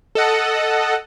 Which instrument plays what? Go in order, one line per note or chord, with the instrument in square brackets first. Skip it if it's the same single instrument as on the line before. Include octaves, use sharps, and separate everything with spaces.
[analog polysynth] A4 D#5 F#5